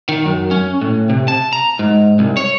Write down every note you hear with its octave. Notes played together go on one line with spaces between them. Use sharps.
D#3
F#2
C#4
A2
C3
A5
A#5
G#2
C2
C#5